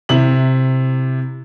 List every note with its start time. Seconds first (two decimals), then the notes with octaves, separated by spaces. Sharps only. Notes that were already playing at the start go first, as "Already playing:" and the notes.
0.09 C3 E4 F#7